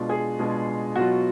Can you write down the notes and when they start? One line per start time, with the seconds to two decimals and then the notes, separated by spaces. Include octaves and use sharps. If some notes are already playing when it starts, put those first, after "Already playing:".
Already playing: B2 G#3 D4 F4
0.09 G#4
0.39 B2 G#3 D4 F4
0.96 B2 F#3 B3 F4 F#4